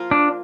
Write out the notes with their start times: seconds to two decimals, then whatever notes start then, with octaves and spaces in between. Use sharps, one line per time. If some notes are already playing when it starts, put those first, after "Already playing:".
Already playing: F3 A#3 F4 A#4
0.11 D4